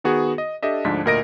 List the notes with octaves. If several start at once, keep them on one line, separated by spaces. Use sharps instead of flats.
D#3 B3 F#4 G#4
D#5
D4 G4 A4 D#5 E5
D2 G#2 F3 D4 B6
D2 A#2 A#4 D#5 A#6 D7